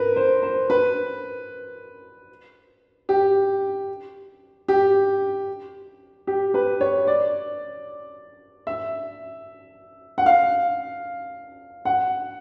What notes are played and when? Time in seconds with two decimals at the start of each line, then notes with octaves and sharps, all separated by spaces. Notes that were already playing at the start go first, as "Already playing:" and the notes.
Already playing: A#4 B4
0.16 C5
0.43 C5
0.70 B4
3.09 G4
4.68 G4
6.27 G4
6.54 B4
6.81 C#5
7.07 D5
8.67 E5
10.18 F#5
10.26 F5
11.85 F#5